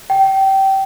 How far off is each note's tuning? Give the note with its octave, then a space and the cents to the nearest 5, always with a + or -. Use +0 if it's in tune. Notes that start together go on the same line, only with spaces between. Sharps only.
G5 -20